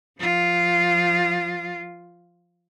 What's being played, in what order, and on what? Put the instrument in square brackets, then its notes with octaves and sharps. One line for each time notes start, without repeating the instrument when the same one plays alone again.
[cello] F3 F4